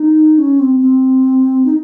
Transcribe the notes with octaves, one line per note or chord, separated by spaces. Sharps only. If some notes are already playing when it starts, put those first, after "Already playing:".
Already playing: D#4
C#4
C4
C4
D#4